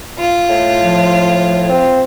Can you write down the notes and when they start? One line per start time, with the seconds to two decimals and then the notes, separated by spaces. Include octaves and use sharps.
0.18 F4
0.49 A2
0.80 F3
1.69 C4